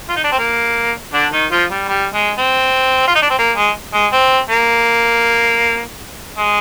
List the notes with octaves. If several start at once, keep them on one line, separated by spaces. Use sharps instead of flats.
F4
D#4
D4
C4
A#3
D3 D4
D#3 D#4
F3 F4
G3
G3
G#3
C4
F4
D#4
D4
C4
A#3
G#3
G#3
C4
A#3
G#3